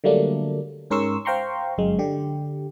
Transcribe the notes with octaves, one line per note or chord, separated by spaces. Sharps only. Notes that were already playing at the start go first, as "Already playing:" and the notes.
D3 F#3 G3 A3 A#3 D4
G#2 C#4 A#4 C6 C#6 E6
C5 F5 G5 A#5 C6 C#6
G1 F#2 G#3
D3 G4